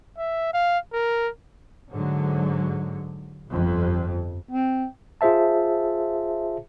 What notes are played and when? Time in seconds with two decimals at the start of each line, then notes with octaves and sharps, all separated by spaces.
0.18 E5
0.53 F5
0.93 A#4
1.92 G#2 D3 F#3
3.49 G1 F2
4.51 C4
5.21 F4 G#4 C5 E5 A5